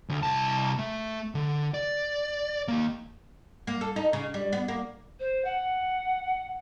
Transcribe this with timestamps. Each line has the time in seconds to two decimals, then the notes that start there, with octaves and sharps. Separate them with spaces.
0.09 D2
0.23 C2 A5
0.79 A3
1.35 D3
1.74 D5
2.68 D#3 A#3
3.67 A#3
3.81 A4
3.96 D#4
4.13 C#3
4.34 G3
4.53 B3
4.68 A#3
5.19 C5
5.44 F#5